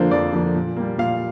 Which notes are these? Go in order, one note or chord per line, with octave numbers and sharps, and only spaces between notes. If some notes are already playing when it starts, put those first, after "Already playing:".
Already playing: F2 D3 F3 A#3 D4 C5
F2 D5
D3 F3 A#3 D4
A#2
G3 A#3
A#2 F5